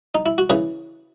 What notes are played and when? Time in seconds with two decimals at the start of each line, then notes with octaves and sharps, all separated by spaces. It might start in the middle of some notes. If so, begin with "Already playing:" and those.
0.15 D#4
0.26 E4
0.38 F#4
0.50 C#3 E3 G#4